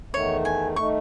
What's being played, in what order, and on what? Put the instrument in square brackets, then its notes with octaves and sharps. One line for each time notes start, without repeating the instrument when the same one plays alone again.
[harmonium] E2 D#3 A3 [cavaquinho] C#5
[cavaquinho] G#5
[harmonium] D#3 A3 [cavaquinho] C#6